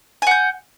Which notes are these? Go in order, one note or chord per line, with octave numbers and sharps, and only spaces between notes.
F#5 G#5 G6